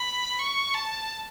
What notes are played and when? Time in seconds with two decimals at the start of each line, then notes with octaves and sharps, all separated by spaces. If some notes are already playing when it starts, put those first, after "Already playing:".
Already playing: B5
0.39 C#6
0.74 A5